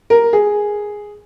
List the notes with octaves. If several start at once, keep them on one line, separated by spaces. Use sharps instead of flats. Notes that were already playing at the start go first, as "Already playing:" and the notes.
A#4
G#4